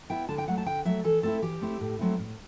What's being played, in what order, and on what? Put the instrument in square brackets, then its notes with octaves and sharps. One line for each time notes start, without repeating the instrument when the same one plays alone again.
[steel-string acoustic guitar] B3 E4 G5
D3 A5
G5
F#3 A3 F#5
A5
D3 G5
F#3 A3 E5
E3 A4
A3 C4 E4 A4
E3 G4
A3 C4 E4
A2
F#3 A3 C4 E4
A2